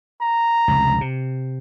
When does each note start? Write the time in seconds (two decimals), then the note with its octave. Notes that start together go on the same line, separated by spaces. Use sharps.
0.21 A#5
0.68 F1 C#2
1.01 C3